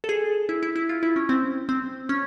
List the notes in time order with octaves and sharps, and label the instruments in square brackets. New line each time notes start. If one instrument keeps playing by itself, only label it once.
[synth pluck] A4
G#4
E4
E4
E4
F4
E4
C#4
C4
C4
C#4